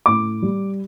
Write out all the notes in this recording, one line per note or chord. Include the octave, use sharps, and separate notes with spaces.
A2 D6
G3